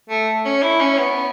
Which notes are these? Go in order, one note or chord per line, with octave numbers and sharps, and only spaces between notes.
A3
C#4
E4
C#4
B3